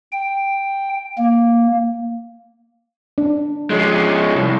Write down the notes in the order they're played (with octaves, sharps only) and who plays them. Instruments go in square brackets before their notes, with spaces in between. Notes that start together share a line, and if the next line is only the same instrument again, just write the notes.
[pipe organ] G5
A#3
[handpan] D4
[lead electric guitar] F3 G#3
C2